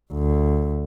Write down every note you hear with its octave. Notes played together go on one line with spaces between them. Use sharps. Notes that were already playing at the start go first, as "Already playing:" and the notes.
D2